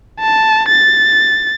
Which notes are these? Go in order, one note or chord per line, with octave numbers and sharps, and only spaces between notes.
A5
A6